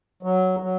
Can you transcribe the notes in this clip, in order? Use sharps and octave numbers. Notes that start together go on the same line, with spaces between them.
F#3
F#3